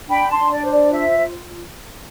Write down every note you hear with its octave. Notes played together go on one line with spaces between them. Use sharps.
D4 G5 B5
A5 C6
D4
D5
C5
D5
F4 E5